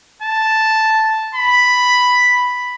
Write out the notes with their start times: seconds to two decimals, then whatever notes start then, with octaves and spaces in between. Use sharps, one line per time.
0.22 A5
1.35 B5